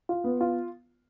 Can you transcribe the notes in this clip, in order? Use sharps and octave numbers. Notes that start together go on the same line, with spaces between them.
F4
B3
F4